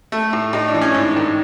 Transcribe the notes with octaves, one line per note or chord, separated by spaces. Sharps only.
A3
A2
A2 D#4
D4
E3
C#4
G#2 D4
D#3